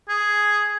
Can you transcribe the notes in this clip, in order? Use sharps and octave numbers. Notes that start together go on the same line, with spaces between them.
G#4